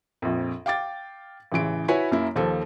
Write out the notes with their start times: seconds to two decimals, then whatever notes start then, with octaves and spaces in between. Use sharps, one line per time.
0.22 A#1 F2
0.66 F5 G5 D6 A6
1.52 A1 C#3 E3 D7
1.88 E4 F#4 B4 C#5 G#5
2.11 F#2 A#3 E4
2.36 D#2 F3 A4